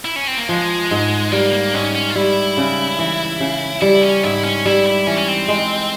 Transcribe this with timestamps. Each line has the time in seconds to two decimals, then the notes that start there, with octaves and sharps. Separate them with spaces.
0.05 E4
0.16 C#4
0.27 C4
0.38 A#3
0.49 F3 G#3
0.91 G#2
1.32 G3 A#3
1.52 A#3
1.74 G#2 C#4
1.95 C#4
2.10 F4
2.15 G3 E4
2.57 C#3
2.99 E3
3.40 C#3
3.82 G3 E4
4.02 C#4
4.23 G#2 E4
4.44 C#4
4.65 G3 E4
4.86 E4
5.07 E3 C#4
5.18 C#4
5.28 C4
5.48 G#3